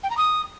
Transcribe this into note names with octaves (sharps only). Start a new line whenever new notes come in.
G5
A#5
D#6